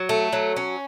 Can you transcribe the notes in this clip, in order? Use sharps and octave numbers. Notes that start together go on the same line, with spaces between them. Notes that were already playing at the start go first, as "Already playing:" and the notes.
Already playing: F#3
A3
F#3
C#4